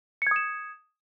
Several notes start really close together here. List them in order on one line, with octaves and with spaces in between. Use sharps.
C#7 G#6 D#6 E7